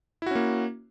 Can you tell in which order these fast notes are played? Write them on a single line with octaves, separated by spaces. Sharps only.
E4 F#4 C#4 A#3